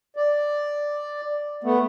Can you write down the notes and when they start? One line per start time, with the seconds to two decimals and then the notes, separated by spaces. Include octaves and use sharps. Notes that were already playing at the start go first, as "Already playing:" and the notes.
0.16 D5
1.64 A3 B3